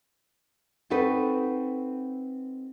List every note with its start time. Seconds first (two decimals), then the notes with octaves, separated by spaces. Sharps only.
0.90 C4 D#4 F#4 A4 B4